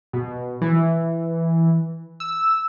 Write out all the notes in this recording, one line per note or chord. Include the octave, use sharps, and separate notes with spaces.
B2
E3
E6